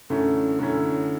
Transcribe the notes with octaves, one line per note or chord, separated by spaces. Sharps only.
F#2 D3 A3 C#4 E4
F#2 D3 A3 C#4 E4